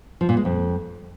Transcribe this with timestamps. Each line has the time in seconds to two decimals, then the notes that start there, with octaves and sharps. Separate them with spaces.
0.21 F3
0.29 A#2
0.37 G#3
0.45 F2